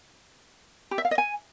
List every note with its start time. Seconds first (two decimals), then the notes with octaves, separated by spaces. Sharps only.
0.91 G4
0.98 E5
1.05 F5
1.11 D#5
1.18 G#5